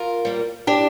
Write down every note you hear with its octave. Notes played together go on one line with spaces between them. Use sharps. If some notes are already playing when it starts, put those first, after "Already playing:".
Already playing: F4 A#4
G3 A#3
D4 G4